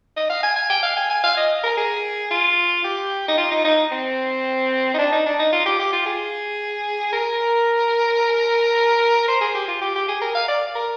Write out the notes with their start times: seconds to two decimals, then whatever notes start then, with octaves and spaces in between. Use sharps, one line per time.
0.16 D#5
0.30 F5
0.43 G#5
0.56 G#5
0.70 G5
0.83 F5
0.97 G#5
1.10 G#5
1.23 F5
1.37 D#5
1.63 A#4
1.77 G#4
2.31 F4
2.84 G4
3.28 D#4
3.38 F4
3.51 D#4
3.64 D#4
3.92 C4
4.94 D#4
4.98 D4
5.12 D#4
5.26 D4
5.39 D#4
5.52 F4
5.66 G4
5.79 G4
5.93 F4
6.06 G#4
7.13 A#4
9.28 C5
9.41 G#4
9.55 G4
9.68 F4
9.81 G4
9.95 G4
10.08 G#4
10.21 A#4
10.35 F5
10.48 D5
10.75 A#4